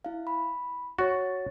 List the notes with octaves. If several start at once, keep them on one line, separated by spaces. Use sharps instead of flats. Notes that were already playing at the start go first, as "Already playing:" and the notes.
E4 F5
B5
F#4 C#5 A6